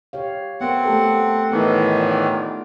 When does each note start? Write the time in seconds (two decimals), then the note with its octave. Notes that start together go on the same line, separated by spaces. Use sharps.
0.13 G4 C#5 F5
0.61 B3 C4 A#4 F#5
0.85 A3 G4 A4
1.51 A2 D#3 E3 B3 D#4 E4
1.98 F4 D5